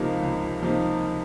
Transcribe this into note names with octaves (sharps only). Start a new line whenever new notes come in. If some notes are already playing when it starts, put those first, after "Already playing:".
Already playing: C#2 C3 F3 A#3 D#4
C#2
C3 F3 A#3 D#4